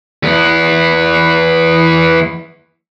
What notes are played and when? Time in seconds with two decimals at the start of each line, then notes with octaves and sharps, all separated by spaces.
0.23 E2 B3